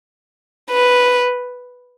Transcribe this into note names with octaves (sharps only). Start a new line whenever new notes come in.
B4